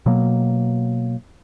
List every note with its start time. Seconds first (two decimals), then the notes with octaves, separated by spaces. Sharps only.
0.06 B2 F#3 A#3